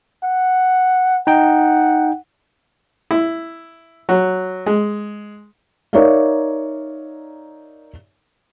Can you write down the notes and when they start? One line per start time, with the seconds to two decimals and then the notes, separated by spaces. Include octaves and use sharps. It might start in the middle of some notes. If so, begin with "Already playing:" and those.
0.24 F#5
1.27 D#4 F#5 G5
3.11 E4
4.09 F#3
4.66 G#3
5.93 D#4 A#4 C#5 D5 E5 F5